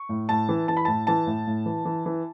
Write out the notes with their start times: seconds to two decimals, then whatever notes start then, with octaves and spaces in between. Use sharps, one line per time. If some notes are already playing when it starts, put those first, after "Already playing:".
Already playing: C#6
0.09 A2
0.29 A2 A5
0.49 E3
0.68 E3 A5
0.77 B5
0.85 A2 A5
1.07 E3 A5
1.27 A2
1.47 A2
1.66 E3
1.85 E3
2.06 E3